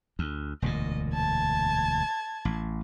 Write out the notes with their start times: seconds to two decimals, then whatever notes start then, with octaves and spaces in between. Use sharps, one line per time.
0.19 D2
0.62 E1 D2 A#2 D#5
1.14 A5 G#6
2.45 A1